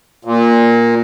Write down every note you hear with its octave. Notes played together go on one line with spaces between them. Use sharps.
A#2